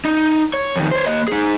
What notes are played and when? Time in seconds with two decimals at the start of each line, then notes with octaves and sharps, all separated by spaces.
0.05 D#4
0.54 C#5
0.76 F2 D#3
0.91 C5 C#5
1.07 A#3 D#5
1.28 D#4 G#4